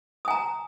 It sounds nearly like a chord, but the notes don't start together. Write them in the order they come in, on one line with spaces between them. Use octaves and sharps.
D#6 G#5 A#5